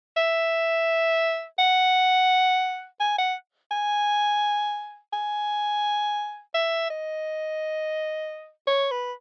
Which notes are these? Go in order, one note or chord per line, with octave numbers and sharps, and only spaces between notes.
E5
F#5
G#5
F#5
G#5
G#5
E5
D#5
C#5
B4